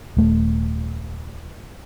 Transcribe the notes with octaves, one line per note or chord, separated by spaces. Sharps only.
D#1 A3